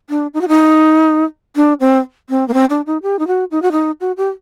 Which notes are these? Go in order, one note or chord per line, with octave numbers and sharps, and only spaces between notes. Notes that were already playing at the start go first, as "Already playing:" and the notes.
D4
D#4
F#4
D#4
D4
C4
C4
A#3
C4
D4
D#4
G4
D#4
F#4
D#4
F#4
D#4
F#4
G4